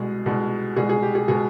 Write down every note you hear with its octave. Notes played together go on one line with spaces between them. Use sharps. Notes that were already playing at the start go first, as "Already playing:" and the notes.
Already playing: C2 B2 G#3 G#4
C2 B2 G#3
C2 B2 G#3 G#4
G#4
G4
G#4
B2 G#3 G#4